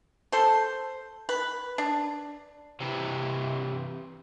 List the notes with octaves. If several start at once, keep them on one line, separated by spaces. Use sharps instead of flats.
A4 C5
B4
D4
C3 E3